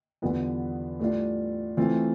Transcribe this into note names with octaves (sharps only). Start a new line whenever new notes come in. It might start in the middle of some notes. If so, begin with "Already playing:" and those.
E2 D3 G3 B3 F4
A2 G3 D4 F4
E3 A3 C4 F4